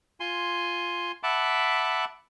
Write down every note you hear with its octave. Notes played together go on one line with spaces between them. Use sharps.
F4 G#5 C6
E5 F#5 A5 B5 D6